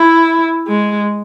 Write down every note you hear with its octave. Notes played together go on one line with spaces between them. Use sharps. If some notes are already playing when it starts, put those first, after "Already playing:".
Already playing: E4
G#3